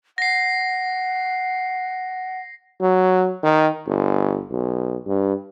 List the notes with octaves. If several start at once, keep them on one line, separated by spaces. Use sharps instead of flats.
F#5 A#6 C7
F#3
D#3
G1
B1
G2